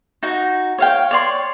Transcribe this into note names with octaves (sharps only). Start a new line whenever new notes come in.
D#4 F#4
C#5 F5 G5
C#5 D5 C6